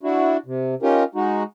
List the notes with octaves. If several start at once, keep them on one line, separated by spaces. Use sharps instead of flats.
D4 E4 F#4
C3
C#4 D#4 F4 G4 A#4
G#3 D#4 F#4